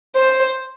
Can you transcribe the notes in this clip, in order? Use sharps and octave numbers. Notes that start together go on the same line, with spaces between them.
C5